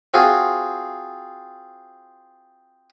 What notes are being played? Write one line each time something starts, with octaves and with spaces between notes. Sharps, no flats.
C4 F4 F#4 G#4